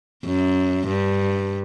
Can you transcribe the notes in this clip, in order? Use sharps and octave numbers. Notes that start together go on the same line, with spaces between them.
F#2
G2